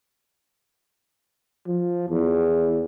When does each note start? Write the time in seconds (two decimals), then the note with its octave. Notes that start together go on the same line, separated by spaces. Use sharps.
1.67 F3
2.10 E2